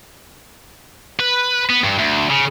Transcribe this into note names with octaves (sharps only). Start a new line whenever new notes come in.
B4
B3
G2
D2
C#3